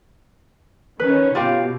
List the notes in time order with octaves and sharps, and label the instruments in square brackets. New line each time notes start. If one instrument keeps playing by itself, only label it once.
[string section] D#3 C#4 [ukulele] B4
[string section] B2 [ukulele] F4 G4 F5